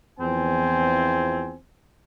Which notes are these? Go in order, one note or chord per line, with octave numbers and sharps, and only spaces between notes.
E2 F3 C4 G#5